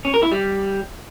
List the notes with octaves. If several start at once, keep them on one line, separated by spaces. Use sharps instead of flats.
C#4
A#4
E4
G3